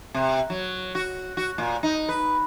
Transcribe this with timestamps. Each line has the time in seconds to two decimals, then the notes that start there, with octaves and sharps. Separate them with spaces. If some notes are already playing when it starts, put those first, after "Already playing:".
0.14 C3
0.50 F#3
0.95 F#4
1.37 F#4
1.58 A#2
1.83 D#4
2.09 B4